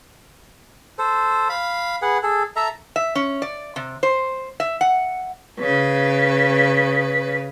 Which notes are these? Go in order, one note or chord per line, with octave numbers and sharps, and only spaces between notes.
A4 C5
F5 B5
G#4 B4 F#5
G#4 A4
A4 E5 A#5
E5
C#4
D5
C3
C5
E5
F#5
C#3 B4